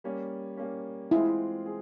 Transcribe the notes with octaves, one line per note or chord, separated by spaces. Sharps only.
G3 A#3 C#4
G3 A#3 C#4
E3 G#3 C4 E4 F4 G#4
G#4